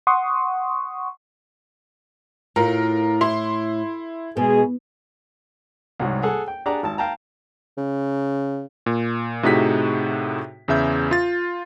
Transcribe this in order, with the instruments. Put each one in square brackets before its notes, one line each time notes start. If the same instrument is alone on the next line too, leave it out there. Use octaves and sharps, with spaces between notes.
[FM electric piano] F#5 C6 C#6 D#6
[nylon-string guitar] A2 [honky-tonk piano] F4 A#4
[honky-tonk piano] E4 C6
[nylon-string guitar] B2 [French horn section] G#3 G#4
[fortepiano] C2 G#2 F#3 F#4
G#4 A4 F#5
G5
D4 G4 G#4 D5 F#5 A#5
G#1 A5
F5 G5 A5 A#5
[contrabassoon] C#3
[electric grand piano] A#2
A2 C3 D#4 F#4 G#4 B6
E2 C#3 E5 G6
F4 A6